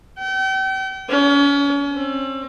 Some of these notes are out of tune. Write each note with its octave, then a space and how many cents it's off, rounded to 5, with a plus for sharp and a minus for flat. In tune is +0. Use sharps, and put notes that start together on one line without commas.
G5 -40
C#4 +35
C4 +40